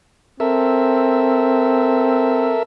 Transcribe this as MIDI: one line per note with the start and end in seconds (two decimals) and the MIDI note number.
0.40 2.60 60
0.40 2.63 69
0.40 2.63 70
0.40 2.63 76